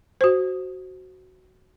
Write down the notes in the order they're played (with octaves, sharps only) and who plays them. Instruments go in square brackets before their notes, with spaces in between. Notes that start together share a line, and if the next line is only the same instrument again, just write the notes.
[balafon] F#4 C5